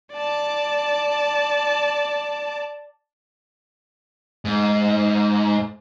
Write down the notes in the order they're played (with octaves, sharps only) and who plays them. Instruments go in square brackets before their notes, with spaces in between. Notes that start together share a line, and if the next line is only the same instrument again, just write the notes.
[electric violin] D5 A5
[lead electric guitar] G#2